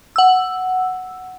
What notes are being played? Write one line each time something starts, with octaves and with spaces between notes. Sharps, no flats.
F#5 E6